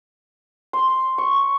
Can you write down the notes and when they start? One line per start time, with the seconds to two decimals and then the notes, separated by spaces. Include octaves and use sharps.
0.73 C6
1.18 C#6